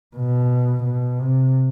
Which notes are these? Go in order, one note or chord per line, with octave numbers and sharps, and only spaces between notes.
B2
B2
C3